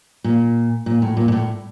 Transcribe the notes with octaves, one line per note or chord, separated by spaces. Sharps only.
A#2
A#2
A2
A#2
A#2
A2